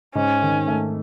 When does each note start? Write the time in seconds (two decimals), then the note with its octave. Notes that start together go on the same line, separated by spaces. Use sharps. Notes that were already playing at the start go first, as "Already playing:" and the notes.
0.15 G#2 C#4
0.42 D#3
0.68 A3